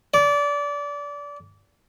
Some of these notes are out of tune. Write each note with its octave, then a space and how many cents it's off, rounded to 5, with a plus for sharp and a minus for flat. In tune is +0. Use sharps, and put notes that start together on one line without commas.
D5 -25